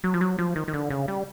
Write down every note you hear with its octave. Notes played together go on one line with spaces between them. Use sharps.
F#3
F3
F#3
F3
D#3
D#3
D3
C#3
G3